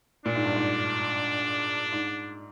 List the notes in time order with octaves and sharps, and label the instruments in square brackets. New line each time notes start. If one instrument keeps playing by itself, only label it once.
[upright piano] A#2 [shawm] D4
[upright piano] G#2
G2
G#2
G#2